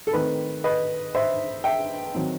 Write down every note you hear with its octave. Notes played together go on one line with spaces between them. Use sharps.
A4
D#3 A3 C4 B4
B4 D#5
C5 E5
E5 G5
D#3 F#3 C4